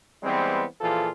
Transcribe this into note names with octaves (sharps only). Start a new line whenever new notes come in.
E3 G3 G#3 B3 C4
A#2 E3 F3 F4 G#4 A4